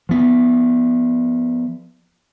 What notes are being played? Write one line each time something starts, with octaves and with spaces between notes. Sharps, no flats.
F3 B3